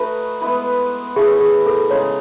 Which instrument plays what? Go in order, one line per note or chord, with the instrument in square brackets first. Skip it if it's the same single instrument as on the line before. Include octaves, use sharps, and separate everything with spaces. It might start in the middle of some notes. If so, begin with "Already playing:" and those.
Already playing: [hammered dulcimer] A3 D#4 F#4 B4 [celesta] A4
[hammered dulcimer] G#3 B3 E4 B4
[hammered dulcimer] A2 E3 A3 E4 [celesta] G#4
[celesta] G#4
A4
[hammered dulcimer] C#3 G#3 D#4 [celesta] C#5